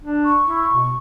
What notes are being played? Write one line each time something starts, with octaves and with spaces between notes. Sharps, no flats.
D4
C#6
E4
B2